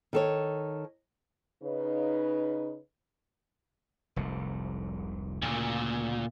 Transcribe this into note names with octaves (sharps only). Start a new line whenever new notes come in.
D#3 A4 C#5
C#3 D#4 B4
F1 C2 G#2
D2 A#2 C#3